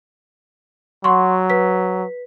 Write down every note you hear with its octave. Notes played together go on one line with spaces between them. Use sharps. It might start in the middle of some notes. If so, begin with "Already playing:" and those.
F#3 F#5 C6 C#6
B4 B6